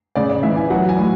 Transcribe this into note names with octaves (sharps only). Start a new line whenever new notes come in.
C#3 D5
D5
E3 E5
G#5
F#3 F#5
G#5
A2